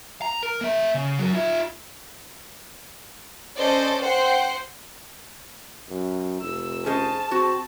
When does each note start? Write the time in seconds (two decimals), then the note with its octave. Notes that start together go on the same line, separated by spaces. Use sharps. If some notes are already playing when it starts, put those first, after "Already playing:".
0.22 A#5
0.43 A#4
0.61 A#3 E5
0.95 C#3
1.19 F#3 A#4
1.33 F4 E5
3.57 C#4 A4 C5 D5 D#5
4.00 C5 F#5 G5 C6
5.89 F#2
6.41 F1 E6
6.86 C#4 G#4 C5 D#5 A5
7.31 C4 F#4